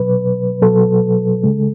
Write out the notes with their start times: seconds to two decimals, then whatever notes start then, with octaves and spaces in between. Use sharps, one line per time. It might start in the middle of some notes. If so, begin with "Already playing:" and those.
Already playing: B2 F#3 B4
0.62 B2 F#3 A4
1.43 C#3 G#3